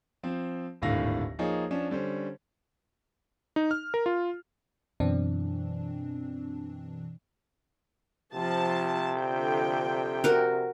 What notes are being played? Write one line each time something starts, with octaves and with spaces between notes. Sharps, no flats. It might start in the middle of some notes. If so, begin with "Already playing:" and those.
F3 C4
D#1 G#1 A2 D3 F5 A#6
F3 A#3 D#4 G#4 C#5
F3 C#4 D4
D3 G3 C#4 C5
D#4
F6
A#4
F4
F#2 B2 E3 C4 D4
C3 F3 A5
D3 F3 G5
F#4 A#4